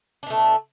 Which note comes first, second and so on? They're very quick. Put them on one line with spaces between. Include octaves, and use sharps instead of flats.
D4 B2 A3